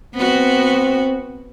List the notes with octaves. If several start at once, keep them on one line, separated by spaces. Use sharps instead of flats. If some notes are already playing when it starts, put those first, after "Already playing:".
B3 C4 F#4